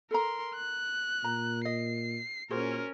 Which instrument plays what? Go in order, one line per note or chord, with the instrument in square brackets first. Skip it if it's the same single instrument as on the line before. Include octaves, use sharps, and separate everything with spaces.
[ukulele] A4 A#5 [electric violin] A#4 C6
[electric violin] F#6
[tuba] A#2 [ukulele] A#5
[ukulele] D#5 [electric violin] C7
[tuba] A#2 [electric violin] C#4 A#4 [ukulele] F#4 G#4 C5